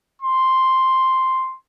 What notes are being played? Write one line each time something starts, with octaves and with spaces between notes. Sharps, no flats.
C6